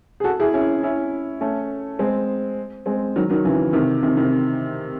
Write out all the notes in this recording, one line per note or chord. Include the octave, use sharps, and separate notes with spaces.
G#4
F#4 A4
E4 G#4
C#4 E4
C#4 E4
A3 C#4
G#3 C4
G#3 C4
D#3 F#3
D#3 F#3
C#3 E3
C3 D#3
C3 D#3
C3 D#3